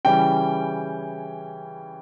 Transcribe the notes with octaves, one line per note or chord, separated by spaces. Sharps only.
C#3 E3 G3 C#4 G5